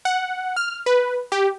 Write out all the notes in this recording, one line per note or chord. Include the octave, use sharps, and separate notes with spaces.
F#5
F6
B4
G4